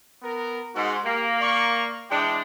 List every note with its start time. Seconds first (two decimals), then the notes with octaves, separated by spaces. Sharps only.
0.22 B3 A#4
0.75 G#2 F#4 C6
1.05 A#3 G4 A#4
1.41 D5 C#6
2.11 E3 G#3 D4 G5